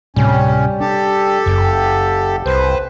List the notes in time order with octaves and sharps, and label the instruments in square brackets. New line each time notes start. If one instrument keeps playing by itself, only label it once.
[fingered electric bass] D1 A2 C3 [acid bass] G3 [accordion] C#4
[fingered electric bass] D4 [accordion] G4 A4
[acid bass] F#1 [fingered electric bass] F#2
[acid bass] C2 [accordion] B4 C5